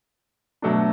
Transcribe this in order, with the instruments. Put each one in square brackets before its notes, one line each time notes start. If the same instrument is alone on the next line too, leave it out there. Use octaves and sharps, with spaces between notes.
[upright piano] B2 F#3 A3 D4